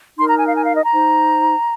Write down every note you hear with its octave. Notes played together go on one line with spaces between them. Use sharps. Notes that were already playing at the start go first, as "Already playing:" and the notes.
D#4 A#4 C6
A#5
G#5
F5
G#5
F5
D#5
A#5
D#4 C5